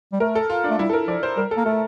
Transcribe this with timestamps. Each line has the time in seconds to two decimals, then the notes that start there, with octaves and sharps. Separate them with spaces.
0.13 G3
0.20 A3 A#4
0.35 A4
0.50 F4
0.64 D4
0.70 A3
0.79 G3 E4
0.89 A4
0.93 A#4
1.08 F3 D5
1.23 C5
1.37 G3 A#4
1.51 A4
1.57 A#3
1.66 A3 A4